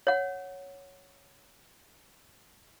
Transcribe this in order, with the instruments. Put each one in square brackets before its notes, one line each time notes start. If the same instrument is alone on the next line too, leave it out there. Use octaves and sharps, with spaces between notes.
[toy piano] C#5 F#5